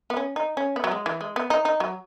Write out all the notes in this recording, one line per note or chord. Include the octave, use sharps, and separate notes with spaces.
B3
C#4
D#4
C#4
B3
F#3
G#3
E3
G#3
B3
D#4
D#4
F#3